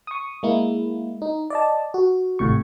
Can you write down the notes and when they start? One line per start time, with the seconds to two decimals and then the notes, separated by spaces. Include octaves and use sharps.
0.07 C#6 D#6
0.43 G#3 A#3 E4
1.22 D#4
1.50 D5 D#5 A5
1.94 F#4
2.39 G#1 A2 C3 C#6